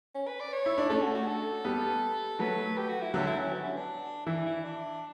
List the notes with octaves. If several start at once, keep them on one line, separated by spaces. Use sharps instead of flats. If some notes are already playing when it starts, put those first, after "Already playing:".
C#4
B4
D5
C#5
E4
D4
A3 C#4 A4
F#4
F#4
A4
G3 B3
F#3 A3 B4
G4
F#4
E4
D3 F#3 G4
E4
C#4
B3
C#4
D4
E3 E4
E4
D4